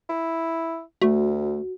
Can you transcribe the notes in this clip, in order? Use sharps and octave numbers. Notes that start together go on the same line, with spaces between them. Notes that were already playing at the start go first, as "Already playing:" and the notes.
E4
D2 A3 F#4